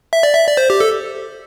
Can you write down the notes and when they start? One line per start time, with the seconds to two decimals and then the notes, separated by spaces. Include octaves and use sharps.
0.13 E5
0.23 D5
0.35 E5
0.47 D5
0.57 C5
0.70 G4
0.80 A4